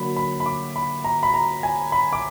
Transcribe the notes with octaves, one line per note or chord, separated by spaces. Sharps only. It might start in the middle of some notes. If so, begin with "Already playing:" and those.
Already playing: D3 F#3 A#3 B5
B5
B5
D6
B5
A#5
B5
A#5
G#5
B5
D6